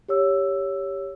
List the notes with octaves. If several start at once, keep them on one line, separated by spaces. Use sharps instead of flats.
G4 C#5 E6